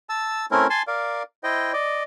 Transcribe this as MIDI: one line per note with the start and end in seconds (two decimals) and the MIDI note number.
0.09 0.46 81
0.09 0.46 88
0.51 0.67 57
0.51 0.67 60
0.51 0.67 61
0.51 0.67 64
0.51 0.67 70
0.70 0.82 80
0.70 0.82 81
0.70 0.82 84
0.87 1.23 70
0.87 1.23 74
0.87 1.23 77
1.44 1.73 64
1.44 1.73 72
1.44 1.73 75
1.44 1.73 79
1.73 2.03 74
1.73 2.03 75